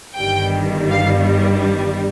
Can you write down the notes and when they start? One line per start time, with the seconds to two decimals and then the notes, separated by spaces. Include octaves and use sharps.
0.16 G1 G2 D#3 G3 G5
0.90 F5